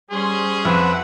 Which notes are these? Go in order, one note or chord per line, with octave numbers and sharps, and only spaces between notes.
G3 C#4 G#4 C5 C6
F2 C4 B4 E5 F#5